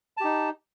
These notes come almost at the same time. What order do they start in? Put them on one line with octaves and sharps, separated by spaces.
A5 G4 D#4